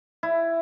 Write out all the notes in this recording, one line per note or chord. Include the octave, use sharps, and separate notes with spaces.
E4